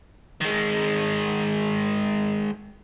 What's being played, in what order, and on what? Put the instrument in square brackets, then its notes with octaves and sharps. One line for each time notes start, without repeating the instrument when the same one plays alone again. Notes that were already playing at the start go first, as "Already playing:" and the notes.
[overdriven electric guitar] D#3 G#3